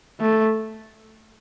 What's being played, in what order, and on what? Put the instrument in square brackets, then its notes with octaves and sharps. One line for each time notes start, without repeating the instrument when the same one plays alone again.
[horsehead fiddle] A3